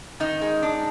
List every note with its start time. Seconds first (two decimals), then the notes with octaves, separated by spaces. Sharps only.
0.20 D#3 D#4
0.41 G#3
0.62 D4